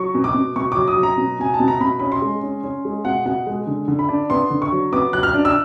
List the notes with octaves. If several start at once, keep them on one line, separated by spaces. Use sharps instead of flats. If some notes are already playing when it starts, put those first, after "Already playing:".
Already playing: F#3 C#6
B2
D6
B2
B2 C#6
F#3 D6
D#6
F#3
A#5
B2
B2 G#5
A5
B2
A#5
B2 B5
C#4 B5
C6
G#3
C#4
C#4
G#3
B2 F#5
B2 F#5
G#3
D3
D3
B5
D4
B3 C6
D3
C#6
F#3
B3 D6
F#3 F#6
F6
D4
E6